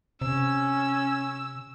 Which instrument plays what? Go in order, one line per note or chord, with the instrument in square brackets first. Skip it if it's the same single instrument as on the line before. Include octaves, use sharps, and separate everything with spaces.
[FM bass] C3 [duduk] C#4 [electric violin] E6